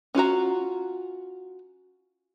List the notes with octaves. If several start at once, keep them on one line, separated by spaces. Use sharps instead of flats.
C#4 F4 F#4 A#5